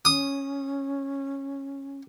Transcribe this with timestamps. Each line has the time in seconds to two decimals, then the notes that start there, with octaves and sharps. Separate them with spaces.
0.05 C#4 D#6